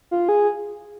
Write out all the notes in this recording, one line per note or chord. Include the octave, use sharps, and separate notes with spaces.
F4
G#4